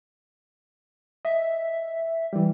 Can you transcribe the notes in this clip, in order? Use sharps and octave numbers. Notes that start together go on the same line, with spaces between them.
D#5 E5
E5
E3 G3